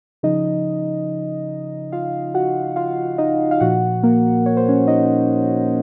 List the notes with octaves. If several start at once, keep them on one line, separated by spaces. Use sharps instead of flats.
C#3 F3 D#4 D#5
F4 F5
F#4 F#5
F4 F5
D#4 D#5
F5
A#2 F3 F#4 F#5
A#3 A#4
C#5
C5
C#4 C#5
D#4 D#5